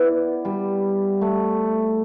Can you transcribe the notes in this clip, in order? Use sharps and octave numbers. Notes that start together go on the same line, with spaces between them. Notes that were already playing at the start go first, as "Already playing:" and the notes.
Already playing: B3 E4 D5
G3
A3